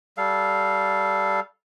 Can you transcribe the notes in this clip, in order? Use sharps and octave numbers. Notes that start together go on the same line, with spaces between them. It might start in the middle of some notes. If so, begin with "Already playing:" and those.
G3 A4 F5